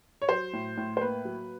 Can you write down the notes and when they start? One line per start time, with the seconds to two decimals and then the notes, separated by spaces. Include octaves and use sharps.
0.22 C#5
0.29 F#3 C5
0.53 A2
0.77 A2
0.97 C5
1.01 A#3 B4
1.25 F#3